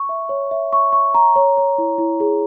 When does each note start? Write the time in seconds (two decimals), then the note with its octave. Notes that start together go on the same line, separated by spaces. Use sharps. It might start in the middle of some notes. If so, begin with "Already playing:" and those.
Already playing: C#6
0.09 E5
0.29 C#5
0.51 E5
0.73 C#6
0.93 C#6
1.14 A#5
1.36 C#5
1.57 C#5
1.78 E4
1.98 E4
2.20 G#4